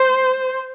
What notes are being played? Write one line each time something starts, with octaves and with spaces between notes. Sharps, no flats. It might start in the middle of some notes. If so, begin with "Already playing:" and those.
Already playing: C5